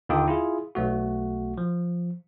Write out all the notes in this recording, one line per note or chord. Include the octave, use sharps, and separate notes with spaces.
D#2 D3 D#4 F4 G5 D#6
E4 F4 G#4
B1 A3 F#4
F3